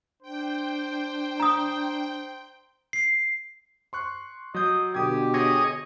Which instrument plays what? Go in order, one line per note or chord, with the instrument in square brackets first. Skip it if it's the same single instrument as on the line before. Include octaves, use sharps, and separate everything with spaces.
[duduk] D4 [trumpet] C5 [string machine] G5
[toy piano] A#5 D#6
[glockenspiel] C7
[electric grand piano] C6 C#6 F#6
[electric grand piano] F#3 G6 [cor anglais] D#5
[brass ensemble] B2 D3 [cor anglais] G4 [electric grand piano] D#6 G#6
[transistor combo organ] G#4 C#5 D#5 [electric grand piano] D#6 A#6